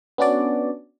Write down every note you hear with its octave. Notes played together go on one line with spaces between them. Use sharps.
B3 C#4 D4 F#4 D5